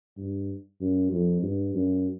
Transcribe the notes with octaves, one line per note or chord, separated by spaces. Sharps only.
G2
F#2
F2
G2
F#2